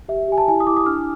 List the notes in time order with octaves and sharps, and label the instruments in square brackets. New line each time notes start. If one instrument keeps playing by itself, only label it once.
[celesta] G4 E5
G4 G#5
A5
E4 G#5
D#6
E4 D6
D#6
D4 F6